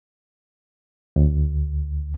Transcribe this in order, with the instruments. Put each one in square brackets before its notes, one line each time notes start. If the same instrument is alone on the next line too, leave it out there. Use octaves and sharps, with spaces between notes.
[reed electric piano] D2